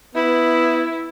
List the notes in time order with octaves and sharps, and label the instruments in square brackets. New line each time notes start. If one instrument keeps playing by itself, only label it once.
[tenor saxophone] B3 [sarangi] E4